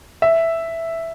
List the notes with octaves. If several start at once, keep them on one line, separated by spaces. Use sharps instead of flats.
E5